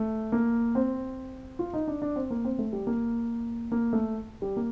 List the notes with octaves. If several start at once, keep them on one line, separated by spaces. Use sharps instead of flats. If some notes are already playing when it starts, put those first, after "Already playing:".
Already playing: A3
A#3
C4
F4
D#4
D4
D4
C4
A#3
C4
A3
G3
A#3
A#3
A3
G3
A#3